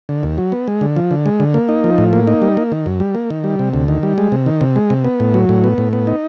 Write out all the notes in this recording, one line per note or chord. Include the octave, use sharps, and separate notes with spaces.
D3
D#2
F#3
B3
G#3
D3
F3
D3
G#3
D3
A#3
D#4
F3
A2
A#3
D#4
G3
A#3
D#3
F#2
G3
A#3
D#3
G3
C3
D2
D#3
G3
G#3
C3
D#3
C3
G#3
C3
B3
A2
F#3
A2
B3
A2
B3
D#4